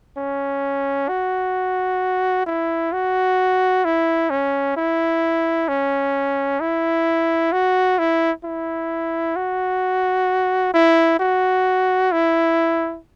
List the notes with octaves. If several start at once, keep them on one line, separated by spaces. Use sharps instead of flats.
C#4
F#4
E4
F#4
E4
C#4
E4
C#4
E4
F#4
E4
E4
F#4
E4
F#4
E4